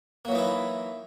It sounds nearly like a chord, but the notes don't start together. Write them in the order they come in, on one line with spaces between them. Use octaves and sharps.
A#3 F#3 E3 D#4 E4